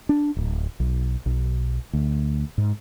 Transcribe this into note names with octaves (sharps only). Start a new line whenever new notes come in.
D4
D1
B1
B1
D2
G#2